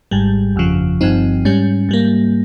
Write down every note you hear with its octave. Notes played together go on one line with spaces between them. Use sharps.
G#1 G#2 G3
G1 F2 C#3 F3
G1 G2 F3 C4 D#4
G#2 G3 C#4
G#2 G3 A#3